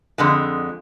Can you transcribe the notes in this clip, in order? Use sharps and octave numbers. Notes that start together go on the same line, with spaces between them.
F2 D3 G#3